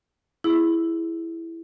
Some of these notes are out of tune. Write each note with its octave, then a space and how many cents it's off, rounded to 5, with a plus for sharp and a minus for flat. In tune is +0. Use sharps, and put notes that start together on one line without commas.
E4 +5 G#4 +0